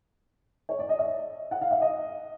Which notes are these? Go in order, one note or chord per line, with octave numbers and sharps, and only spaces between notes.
C#5
D5
D#5
E5
F#5
F5
E5
D#5